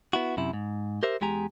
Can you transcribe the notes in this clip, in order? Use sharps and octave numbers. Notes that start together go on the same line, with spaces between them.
B3 E4 F#4
F#2 C3 E4
G#2
G4 A#4 C5 E5
E2 G#3 G4 G#5 A#5